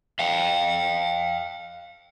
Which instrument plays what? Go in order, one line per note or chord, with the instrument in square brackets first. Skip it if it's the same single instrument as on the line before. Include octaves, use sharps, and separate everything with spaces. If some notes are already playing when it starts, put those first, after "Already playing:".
[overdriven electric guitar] F5 G5